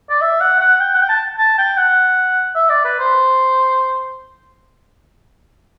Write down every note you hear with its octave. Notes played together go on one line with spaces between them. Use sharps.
D5
E5
F#5
F#5
G5
F#5
G5
A5
A5
G5
F#5
E5
D5
B4
C5